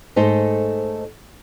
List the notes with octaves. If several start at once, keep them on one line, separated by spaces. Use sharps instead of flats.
G#2 A3 D#4 A4 C5